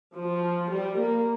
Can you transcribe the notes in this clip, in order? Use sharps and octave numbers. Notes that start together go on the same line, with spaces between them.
F3
G3
A#3